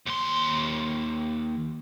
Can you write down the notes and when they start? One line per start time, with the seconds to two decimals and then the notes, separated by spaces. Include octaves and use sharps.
0.06 D#2 C6